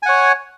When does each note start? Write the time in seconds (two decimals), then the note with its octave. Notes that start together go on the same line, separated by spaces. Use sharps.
0.03 G#5
0.06 F#5
0.09 C#5